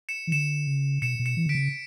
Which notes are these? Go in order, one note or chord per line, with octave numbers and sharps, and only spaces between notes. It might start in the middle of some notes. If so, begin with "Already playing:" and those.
C#7 E7
E3
D3 C#7 E7
C#3
B2 C#7 E7
B2
C#7 E7
E3
D3 B6 D7
C#3